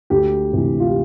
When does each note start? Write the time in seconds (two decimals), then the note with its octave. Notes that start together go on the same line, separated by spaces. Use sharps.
0.10 D2 G4
0.53 C3 E3
0.80 F4
0.87 G4